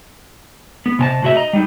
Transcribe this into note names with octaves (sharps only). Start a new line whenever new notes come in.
B3
C3 G#5 A5
A2 C3 F#4 C5 E5
D#5 A#5
G3 D#4